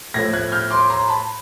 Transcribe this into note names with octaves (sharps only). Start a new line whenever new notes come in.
A2 F3 A3 G#6 A#6
F#6 G#6
F6 G6
C6 D6
A#5 C6
A5 B5